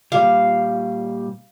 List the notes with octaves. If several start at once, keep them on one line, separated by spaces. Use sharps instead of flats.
A#2 G3 F5